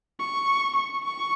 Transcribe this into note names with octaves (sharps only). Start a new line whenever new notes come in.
C#6
C#6
C#6